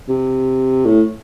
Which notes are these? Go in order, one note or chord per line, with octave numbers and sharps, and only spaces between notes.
C3
A2